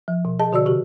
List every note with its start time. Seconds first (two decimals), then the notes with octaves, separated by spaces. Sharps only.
0.08 F3
0.25 B2
0.39 G#4 D#5 A5
0.52 B2 D3 F#4 D5 E6
0.66 C3 F#4 G4